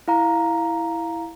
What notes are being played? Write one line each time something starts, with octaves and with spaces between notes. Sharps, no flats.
E4 F5 A#5